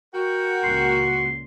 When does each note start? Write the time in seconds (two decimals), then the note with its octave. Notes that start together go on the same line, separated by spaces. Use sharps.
0.15 F#4 A#4 G5
0.64 C#2 A#2 C6